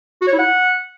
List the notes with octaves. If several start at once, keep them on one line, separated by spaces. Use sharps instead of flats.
F#4
C#5
E4
F#5